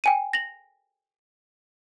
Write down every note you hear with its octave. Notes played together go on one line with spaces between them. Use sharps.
G5 G#5 D#7
A#6 F7 F#7